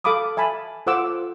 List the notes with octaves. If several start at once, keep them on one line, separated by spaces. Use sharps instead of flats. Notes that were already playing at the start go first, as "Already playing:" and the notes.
A4 F5 B5 D6 D#6
E5 G#5 A5 B5
F4 A4 C5 F#5 D6 E6